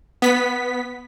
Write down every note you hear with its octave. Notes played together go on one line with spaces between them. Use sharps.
B3 B6